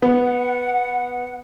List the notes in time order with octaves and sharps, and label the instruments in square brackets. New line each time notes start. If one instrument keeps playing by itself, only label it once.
[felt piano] B3 [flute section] F#5